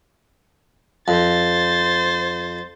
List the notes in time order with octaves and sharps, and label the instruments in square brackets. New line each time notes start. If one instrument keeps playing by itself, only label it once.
[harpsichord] F2 [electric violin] C5 A6